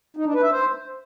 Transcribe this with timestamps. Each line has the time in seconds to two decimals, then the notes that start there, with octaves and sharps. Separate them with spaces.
0.17 D#4
0.25 D4
0.34 B4
0.43 E5
0.51 C5